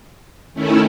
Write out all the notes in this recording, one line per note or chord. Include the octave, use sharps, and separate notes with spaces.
D#3 A3 C#4 E4